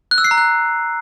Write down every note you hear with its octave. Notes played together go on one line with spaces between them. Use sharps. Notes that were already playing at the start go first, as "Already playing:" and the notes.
F#6
E6
C7
A#5
F#6